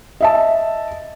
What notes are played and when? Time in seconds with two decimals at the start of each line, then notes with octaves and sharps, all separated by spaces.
0.21 D#5 E5 A5